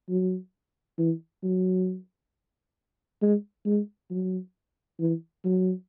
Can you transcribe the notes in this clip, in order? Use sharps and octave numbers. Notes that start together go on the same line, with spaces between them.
F#3
E3
F#3
G#3
G#3
F#3
E3
F#3